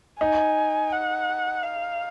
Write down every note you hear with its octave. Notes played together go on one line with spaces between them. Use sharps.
D#4 G#5
F#5
F5